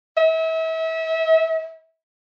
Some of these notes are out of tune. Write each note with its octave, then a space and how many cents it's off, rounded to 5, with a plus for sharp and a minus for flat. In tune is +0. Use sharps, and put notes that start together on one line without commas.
E5 -35